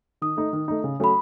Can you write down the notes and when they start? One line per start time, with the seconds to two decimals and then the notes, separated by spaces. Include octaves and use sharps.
0.22 D#3 D#6
0.37 A3 D#4
0.53 D#3
0.68 A3 D#4
0.84 C#3
1.00 F#3 A3 C#4 B5